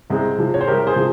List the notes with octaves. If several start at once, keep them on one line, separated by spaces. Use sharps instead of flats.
C2 G#3 C4
C3 F3
C#5
C5
C2 G4 A#4
G#4 C5
C3 F3